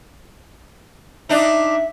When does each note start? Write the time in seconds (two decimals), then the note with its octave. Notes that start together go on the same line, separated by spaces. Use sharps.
1.29 D4 D#4 E5